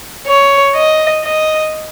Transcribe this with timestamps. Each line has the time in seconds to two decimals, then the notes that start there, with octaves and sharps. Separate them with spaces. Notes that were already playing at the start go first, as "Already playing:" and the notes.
0.27 C#5
0.75 D#5
1.24 D#5